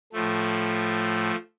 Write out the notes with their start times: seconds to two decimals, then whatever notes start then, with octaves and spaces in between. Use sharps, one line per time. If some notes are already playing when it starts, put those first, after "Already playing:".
0.13 A2 F3 A3